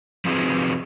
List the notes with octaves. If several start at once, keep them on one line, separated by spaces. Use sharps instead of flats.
F3 C4 D#4 F#4 G#4 B4